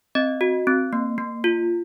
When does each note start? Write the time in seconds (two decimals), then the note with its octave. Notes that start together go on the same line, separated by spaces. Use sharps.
0.15 C4 D#5
0.41 F#4
0.67 C4
0.93 A#3
1.18 A#3
1.44 F4